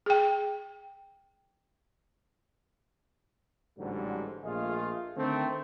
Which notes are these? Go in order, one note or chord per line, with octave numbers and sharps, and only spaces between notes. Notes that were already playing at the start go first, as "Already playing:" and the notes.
G#4 G5
A1 G#2 D3 F#3 G3
A#1 A3 F4 G#4 D#5 F5
D3 D#3 A3 C4